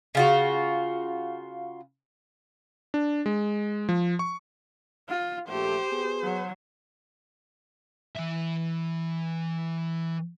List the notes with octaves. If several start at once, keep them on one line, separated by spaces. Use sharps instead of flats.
C#3 F4 F#4
D4
G#3
F3
C#6
F4
A#1 A3 G4 C5
B3 F#4 G#4
F#3
E3 E5